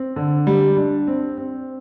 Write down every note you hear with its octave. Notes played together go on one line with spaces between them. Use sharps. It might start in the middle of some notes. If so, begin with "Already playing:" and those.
Already playing: C4
D3
G3
D4
C4
C4